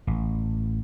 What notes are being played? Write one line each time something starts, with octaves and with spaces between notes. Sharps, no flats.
A1